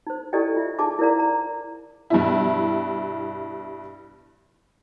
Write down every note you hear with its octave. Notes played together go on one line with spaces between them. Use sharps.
D#4 C5
E4 G4 A4 D5 D#5 G5
F4 E5
D#4 G#4 G#5 A5 D6
E4 A#4 C5 D5 F5 A#5
A#5
G2 B2 E4